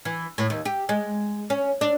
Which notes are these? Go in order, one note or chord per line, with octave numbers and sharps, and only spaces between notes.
E3
A2
D#2
G4
G#3
C#4
D4